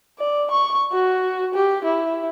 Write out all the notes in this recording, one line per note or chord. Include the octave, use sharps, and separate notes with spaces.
D5
C#6
F#4
G4
E4